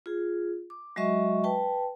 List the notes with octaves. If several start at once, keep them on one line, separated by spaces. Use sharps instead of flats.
F4 G#4
D6
F#3 G#3 F#4 D#5 E5 C#6
B4 G5 A5